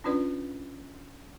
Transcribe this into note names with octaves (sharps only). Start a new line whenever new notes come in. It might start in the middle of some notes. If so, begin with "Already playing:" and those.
C#4 D4 F4 B4 D5